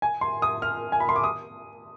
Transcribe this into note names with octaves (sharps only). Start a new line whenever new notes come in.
G#5
C6
D#6
F6
G#5
B5
C6
D6
D#6